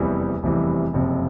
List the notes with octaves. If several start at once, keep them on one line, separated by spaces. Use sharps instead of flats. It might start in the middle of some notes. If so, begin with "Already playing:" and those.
Already playing: F1 E2 C3 E3 G3
F1 E2 C3 E3 G3
F#1 F2 C3